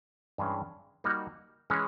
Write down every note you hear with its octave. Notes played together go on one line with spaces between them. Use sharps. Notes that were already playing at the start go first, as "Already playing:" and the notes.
G2 E3 G#3 C#4
G3 A#3 D#4 F#4
E3 G#3 C#4